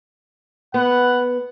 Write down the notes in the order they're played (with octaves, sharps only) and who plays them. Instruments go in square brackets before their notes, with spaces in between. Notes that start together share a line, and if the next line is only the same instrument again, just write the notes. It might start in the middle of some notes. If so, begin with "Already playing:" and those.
[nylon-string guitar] B3 [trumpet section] B4 F#5